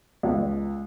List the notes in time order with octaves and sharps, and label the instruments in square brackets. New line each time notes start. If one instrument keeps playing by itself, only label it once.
[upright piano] C#2